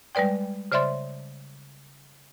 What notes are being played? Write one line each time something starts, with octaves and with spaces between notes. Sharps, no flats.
G3 G#3 B4 D5 G5
C#3 C5 D5 E5 C6 A6